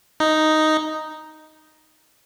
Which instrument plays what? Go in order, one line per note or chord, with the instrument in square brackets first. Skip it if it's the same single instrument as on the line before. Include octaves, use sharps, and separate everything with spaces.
[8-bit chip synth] D#4